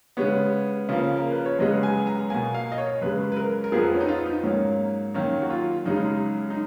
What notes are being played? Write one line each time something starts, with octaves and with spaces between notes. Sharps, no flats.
C#3 G#3 B3 C#5
C#3 F3 A#3
A#4
B4
C#5
F#2 C#3 G#3 B3 D#5
G#5
A#5
B2 A#3 G#5
F5
D#5
C#5
F#2 C#3 G#3 B4
B4
A#4
A#4
F2 F3 B3 G#4
C#4
D#4
F4
D#4
G#2 F#3 A#3 C#4
F#2 D#3 A#3 C#4
F#4
F4
F#2 C#3 G#3 D#4
D#4